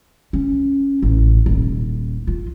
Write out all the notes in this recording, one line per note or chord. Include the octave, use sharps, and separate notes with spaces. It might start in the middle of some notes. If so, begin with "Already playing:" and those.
C#4
A1
D#1
F4